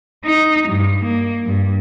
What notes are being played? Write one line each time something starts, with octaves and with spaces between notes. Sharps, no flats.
D#4
G2
A#3
G2